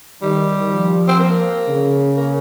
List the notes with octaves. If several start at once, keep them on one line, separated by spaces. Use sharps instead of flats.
D#3 G3
F3
C4
A#3
C#3
A#3